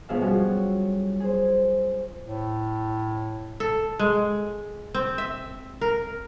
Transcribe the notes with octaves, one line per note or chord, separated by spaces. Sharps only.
G#2 B2 F3 G#4 E5 F5
F#3 G3 C#4 F4 F#4 G#4
G#4 C5
A2
A4
G#3
C4
E5
A#4